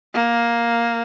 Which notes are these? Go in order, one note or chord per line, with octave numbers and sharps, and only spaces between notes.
A#3